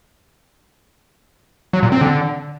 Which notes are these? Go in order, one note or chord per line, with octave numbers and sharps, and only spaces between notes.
F#3
A#2
C4
D3